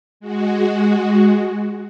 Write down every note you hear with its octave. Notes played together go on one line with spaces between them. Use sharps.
G#3 F#4